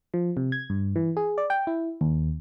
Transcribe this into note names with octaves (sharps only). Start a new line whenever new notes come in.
F3
C3
G#6
G2
E3
G#4
D5
G5
E4
D#2